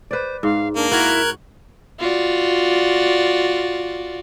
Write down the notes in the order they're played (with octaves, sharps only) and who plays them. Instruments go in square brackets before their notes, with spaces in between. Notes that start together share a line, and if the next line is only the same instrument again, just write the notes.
[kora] B4 D5 [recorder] C5
[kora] G#2 [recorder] F5
[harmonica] A#3 [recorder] D4
[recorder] E4 [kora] F#4 [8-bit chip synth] A#4 F#6 G#6
[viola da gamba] F4 F#4 D5